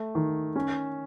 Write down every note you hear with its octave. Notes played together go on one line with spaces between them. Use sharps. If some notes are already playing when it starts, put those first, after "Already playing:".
Already playing: A3
D#3
C#4